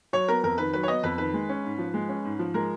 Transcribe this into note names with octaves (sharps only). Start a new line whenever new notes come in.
F#3 C#5
B3 A#4
F2 A#4
D#3 B4
F#3 B4
C#5
B3 D#5
F2 B4
D#3 B4
G#3
C#4
G#2
F3
G#3
C#4
G#2
F3
G#3 A#4